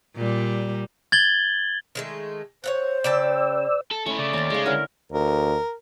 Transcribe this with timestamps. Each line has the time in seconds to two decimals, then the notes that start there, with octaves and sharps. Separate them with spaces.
0.16 A#2 G3
1.12 G#6 A6 F#7 G7
1.95 D#3 G#3 A3
2.64 C5 C#5 F5 F#5
3.04 C#3 D5 G5 A5 E6
3.91 A4
4.06 A3 C#4 E4
4.19 C#3 D5
4.33 D#2 C#4 C6
4.50 C#3 G#3 D#4
4.66 D3 C#4 E4 A#4
5.12 D2 A#4